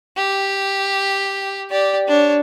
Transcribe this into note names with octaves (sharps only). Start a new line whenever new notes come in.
G4
G4 D5
D4 C#5